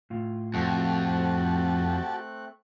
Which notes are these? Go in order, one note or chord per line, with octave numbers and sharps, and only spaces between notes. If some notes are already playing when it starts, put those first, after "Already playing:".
A2 F4
F2 A3 C4 F#4 G4 A5 F#6